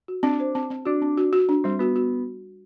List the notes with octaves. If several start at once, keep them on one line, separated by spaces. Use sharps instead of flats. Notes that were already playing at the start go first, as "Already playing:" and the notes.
F#4
C4 D4
C5
C4
C4
D4 F#4
C4
F#4
F#4
D4
G3 C4
B3 F#4
F#4